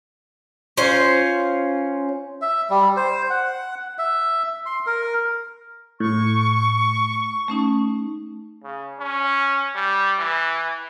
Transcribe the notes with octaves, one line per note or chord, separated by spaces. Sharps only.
C#4 F4 C5
E5
G3
C5
F#5
E5
C6
A#4
A2 C#6
A3 C#4 D#4
C#3
C#4
G3
E3